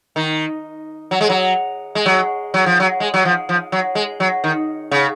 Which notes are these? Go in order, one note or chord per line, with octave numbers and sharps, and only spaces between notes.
D#3
F#3
G#3
F#3
G#3
F#3
F#3
F3
F#3
G#3
F#3
F3
F3
F#3
G#3
F#3
D#3
C#3